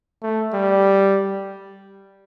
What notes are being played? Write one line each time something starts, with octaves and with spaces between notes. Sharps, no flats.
A3
G3